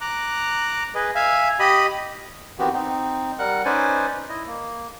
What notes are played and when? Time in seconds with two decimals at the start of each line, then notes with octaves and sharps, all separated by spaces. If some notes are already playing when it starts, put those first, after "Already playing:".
0.01 A#5 D6 F#6
0.95 G#4 B4 D#5
1.15 E5 F5 G#5
1.60 G4 D#5 B5 D#6
2.59 D#3 E3 B3 C4 F#4 G4
2.73 C4 D#4
3.39 G3 A#4 F#5 F#6
3.65 C#4 D#4 B4 C5 D5 G#5
4.29 E4 D#5
4.46 A#3